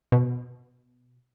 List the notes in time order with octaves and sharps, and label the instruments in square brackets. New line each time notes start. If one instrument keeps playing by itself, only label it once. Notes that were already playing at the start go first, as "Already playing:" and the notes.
[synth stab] B2